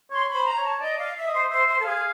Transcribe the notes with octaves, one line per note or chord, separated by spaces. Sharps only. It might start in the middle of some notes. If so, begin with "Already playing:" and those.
C#5 C6
B5
C5
A#5
C#5
A5
D5 D#5
F5
E5
D#5
C5
C5 E5
C5
A4
G#4 F5